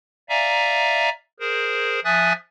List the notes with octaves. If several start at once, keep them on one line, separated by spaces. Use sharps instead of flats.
D5 E5 F5 G#5 A#5
G#4 A#4 C5
F3 E5 G#5 D#6 F#6 A6